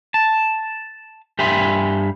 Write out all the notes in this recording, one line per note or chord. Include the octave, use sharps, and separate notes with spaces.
A5
G2 G4 E5 G#5 B5 C6